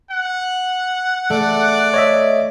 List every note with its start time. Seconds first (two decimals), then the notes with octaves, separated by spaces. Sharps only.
0.10 F#5
1.30 A3 D5
1.94 C#5 D#5 E5